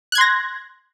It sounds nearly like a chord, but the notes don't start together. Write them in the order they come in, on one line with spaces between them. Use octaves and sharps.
F#6 G#6 C6 A#6